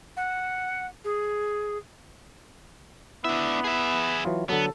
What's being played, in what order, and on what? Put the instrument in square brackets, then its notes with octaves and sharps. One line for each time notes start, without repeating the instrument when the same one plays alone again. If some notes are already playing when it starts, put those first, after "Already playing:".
[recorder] F#5
G#4
[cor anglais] B3 [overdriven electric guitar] D4 E5 [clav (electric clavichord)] E4
[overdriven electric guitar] G#4 E5
[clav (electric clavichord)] E3 F#3 F4
[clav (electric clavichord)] D3 F#3 [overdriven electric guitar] B3 [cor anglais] A4